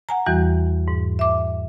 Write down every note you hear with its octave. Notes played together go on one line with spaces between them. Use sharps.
F#5 G#5 A#5
E2 E3 G3 F#4
G#2
E5 D6